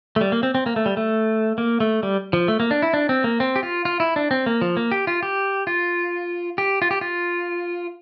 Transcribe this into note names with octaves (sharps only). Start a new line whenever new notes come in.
A3
G3
A#3
C4
C4
A#3
A3
G3
A3
A#3
A3
G3
F3
A3
A#3
D4
E4
D4
C4
A#3
C4
G4
F4
F4
E4
D4
C4
A#3
F3
A#3
G4
F4
G4
F4
G4
F4
G4
F4